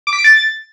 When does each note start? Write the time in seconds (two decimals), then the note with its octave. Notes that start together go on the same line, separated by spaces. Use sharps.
0.07 D6
0.13 B6
0.19 D7
0.24 A6